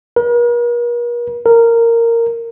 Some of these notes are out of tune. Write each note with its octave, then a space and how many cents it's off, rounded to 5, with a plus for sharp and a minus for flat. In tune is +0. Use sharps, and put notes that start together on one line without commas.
A#4 +45
A#4 -10